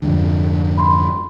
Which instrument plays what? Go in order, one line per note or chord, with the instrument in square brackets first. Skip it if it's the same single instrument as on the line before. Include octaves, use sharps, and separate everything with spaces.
[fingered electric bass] F2 G#2 D3
[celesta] B5 C6